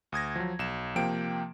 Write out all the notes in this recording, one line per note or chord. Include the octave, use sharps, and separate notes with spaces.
D2 D#6 G#6 A#6
F3 F#3
B1 E7
C3 F3 A#3 G5 D7